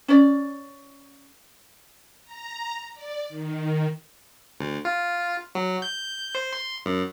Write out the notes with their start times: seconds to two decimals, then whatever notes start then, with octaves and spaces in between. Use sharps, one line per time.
0.08 C#4 D5
2.25 A#5
2.94 D5
3.28 D#3
4.60 D2
4.85 F4
5.55 F#3
5.82 G6
6.35 C5
6.53 C6
6.86 F#2